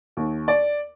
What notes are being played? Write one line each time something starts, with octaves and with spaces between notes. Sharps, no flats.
D#2
D5